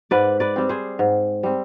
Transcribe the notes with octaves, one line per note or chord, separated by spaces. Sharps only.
G#2 B4 D5
B4 D5
G3 C4
G#4 C5
G#2
G3 C4